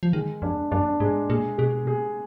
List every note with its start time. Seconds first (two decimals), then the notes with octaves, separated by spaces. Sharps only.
0.03 F3
0.13 D#3 G#3
0.42 F2 D4
0.71 F#2 D4
1.00 G#2 G#3
1.29 A#2 G#4
1.58 B2 G#4
1.87 G#4